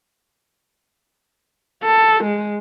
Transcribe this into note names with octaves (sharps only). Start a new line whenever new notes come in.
A4
G#3